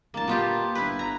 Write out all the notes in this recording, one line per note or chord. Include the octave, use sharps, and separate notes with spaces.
D1 A#3 A5
A#2 B3 F4 G4
G1 E4 B4
A#5